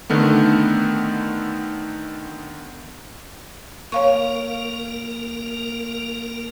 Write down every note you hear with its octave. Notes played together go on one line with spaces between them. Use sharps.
D3 D#3 A3 B3
A#3 A#4 C#5 F5 C#6